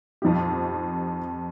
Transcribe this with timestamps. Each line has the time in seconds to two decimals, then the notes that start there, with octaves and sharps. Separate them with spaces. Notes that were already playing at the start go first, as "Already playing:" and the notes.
0.22 F2 F3 D#4 G4